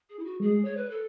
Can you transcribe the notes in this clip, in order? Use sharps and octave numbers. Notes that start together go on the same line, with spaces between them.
G#4
E4
F#4
G#3 G#4
C#5
B4
A4